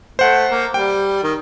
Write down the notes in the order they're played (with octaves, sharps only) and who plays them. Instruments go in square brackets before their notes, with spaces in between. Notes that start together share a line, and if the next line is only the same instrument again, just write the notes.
[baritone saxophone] A3 [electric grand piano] C5 F#5
[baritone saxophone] A#3
[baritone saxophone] G3 [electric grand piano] G5
[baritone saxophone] D#3